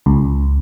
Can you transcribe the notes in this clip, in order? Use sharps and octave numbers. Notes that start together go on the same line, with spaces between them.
C#2